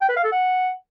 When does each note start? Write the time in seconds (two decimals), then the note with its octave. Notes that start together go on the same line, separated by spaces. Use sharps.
0.01 G5
0.09 B4
0.17 F5
0.24 A4
0.32 F#5